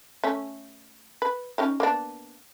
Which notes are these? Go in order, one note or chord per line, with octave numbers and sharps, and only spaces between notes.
A3 C#4
B4
C#4 D#4 G4
A#3 B3 D4